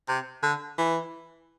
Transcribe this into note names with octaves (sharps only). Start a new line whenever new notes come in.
C3
D3
E3